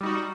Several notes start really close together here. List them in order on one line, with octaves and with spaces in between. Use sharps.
G3 D#4 F#4